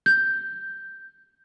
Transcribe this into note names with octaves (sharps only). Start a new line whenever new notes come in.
G6